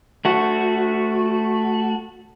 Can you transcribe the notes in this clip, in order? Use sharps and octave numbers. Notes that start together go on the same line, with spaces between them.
A3 F#4